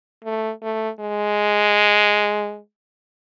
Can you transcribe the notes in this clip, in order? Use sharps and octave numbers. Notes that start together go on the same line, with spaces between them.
A3
A3
G#3